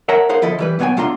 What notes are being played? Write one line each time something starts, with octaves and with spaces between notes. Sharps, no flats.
A#4 C#5 E5 F#5 A5 A#5
G#4 A#4 C5 F5 F#5
D2 F3 E4 A4 D#5
E3 G3 B4
B2 F#3 B3 C#5 G5 G#5
B2 A3 D4 F4 A#5 C6